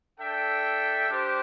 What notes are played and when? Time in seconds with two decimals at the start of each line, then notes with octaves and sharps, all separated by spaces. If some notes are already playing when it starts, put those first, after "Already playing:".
0.20 D4 A4 E5 G5
1.08 G3 D4 G4 C5